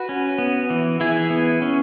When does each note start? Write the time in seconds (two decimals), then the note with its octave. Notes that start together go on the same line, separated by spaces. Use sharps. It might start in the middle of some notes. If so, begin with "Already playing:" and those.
Already playing: F#4 B4
0.09 C#4
0.38 B3
0.70 E3
1.00 E3 E4 G#4
1.30 B3
1.62 C#4